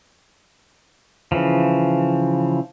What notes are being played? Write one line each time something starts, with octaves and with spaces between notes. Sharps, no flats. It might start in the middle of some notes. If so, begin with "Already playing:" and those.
C#3 E3 F3